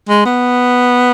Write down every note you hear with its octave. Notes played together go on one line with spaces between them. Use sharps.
G#3
B3